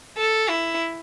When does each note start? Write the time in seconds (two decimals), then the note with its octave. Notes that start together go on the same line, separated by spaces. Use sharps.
0.17 A4
0.49 E4